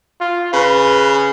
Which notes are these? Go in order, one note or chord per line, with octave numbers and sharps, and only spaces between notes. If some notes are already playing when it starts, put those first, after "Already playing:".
F4
C#3 B4